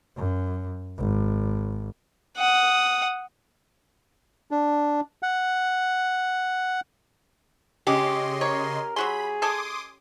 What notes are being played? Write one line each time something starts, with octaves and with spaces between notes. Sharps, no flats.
F#2
G#1
F#5 D#6
D4
F#5
C#3 G#3 C#4 G4 D#5 C6
A#4 C#5
F#3 F#4 G#4 B5 C6
A4 D#5 G#5 C6 D6 D#6